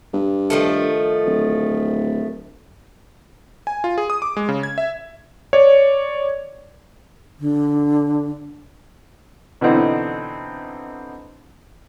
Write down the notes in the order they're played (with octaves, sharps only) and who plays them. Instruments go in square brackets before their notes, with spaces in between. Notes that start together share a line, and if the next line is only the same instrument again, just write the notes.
[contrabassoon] G2
[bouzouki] D#3 F3 A3
[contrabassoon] D1
[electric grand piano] G#5
F4
G#4
D#6
D6
G#3
C#3
G#6
E5
C#5 D5
[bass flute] D3
[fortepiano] B2 D3 E3 C4 D#4 E4